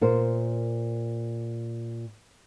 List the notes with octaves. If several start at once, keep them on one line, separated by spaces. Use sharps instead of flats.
A#2 A#4 C5